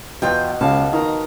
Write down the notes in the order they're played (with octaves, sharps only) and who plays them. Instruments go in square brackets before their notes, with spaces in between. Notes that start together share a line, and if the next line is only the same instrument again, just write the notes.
[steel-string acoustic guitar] E2 F4 G5 [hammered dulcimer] B2
[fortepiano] C#2 [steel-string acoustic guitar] F5 A5
[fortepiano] D#3 [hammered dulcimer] A#5